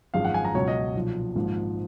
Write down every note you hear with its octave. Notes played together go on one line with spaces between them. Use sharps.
G#1 F#2 F3 G#3 F5
F#5
G#5
A#5
C#2 B2 F#3 C#5
D#5
B1 A#2 F3
G#1 G#2 F3 A#3